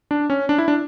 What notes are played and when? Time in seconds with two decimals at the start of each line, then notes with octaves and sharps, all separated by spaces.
0.11 D4
0.30 C#4
0.49 D4
0.58 E4
0.68 D4